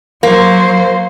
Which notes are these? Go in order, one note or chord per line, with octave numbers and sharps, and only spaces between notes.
F#3 A#3 C5